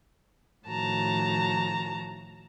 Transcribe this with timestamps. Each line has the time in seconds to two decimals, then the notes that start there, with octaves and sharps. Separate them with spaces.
0.67 A2 D#3 F3 F#4 A5 A#5